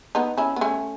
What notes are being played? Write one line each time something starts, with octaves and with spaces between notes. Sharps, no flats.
B3 D#4
C#4 E4
B3
A3 C#4